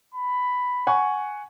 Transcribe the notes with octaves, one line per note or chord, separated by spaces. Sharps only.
B5
F#5 G#5 C#6